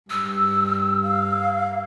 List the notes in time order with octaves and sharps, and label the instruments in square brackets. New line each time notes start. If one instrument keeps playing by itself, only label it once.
[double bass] G2 [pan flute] E6
[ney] F5